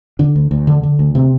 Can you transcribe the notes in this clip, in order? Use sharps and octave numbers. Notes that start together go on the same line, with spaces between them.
D3 D4
D2
D2
D3
D3
D2
C3 C4